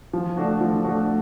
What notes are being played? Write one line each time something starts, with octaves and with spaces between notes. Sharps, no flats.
F3
A3 D4 F#4
F3
A3 D4 F#4